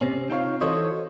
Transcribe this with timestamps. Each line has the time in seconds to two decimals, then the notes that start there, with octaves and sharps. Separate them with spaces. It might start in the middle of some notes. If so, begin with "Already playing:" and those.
0.01 C3 C4 C#4
0.30 C4 D#4 F4 A4 C#5 F5
0.61 E3 F#4 A4 C5 C#5 D#5